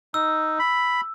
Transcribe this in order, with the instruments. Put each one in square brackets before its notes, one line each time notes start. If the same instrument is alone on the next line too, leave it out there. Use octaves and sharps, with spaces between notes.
[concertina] D#4 [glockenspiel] E6
[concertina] B5